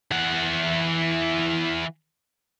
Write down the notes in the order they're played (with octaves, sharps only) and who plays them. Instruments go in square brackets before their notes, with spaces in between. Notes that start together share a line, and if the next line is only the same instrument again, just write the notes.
[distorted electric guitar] E3 F#5